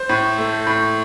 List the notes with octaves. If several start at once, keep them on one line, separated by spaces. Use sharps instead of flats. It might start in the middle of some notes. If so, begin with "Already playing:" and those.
Already playing: C5
A2
A3
A2